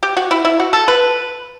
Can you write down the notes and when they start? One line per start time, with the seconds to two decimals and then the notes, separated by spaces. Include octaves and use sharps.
0.03 G4
0.17 F#4
0.31 E4
0.45 E4
0.60 F#4
0.73 A4
0.88 B4